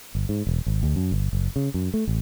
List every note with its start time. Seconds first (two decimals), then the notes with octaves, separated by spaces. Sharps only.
0.15 G1
0.29 G#2
0.47 E1
0.66 G#1
0.83 D2
0.96 F#2
1.12 G1
1.33 F#1
1.56 C#3
1.74 F#2
1.94 A3
2.07 A1